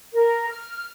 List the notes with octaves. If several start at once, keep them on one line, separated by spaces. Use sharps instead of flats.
A#4
F6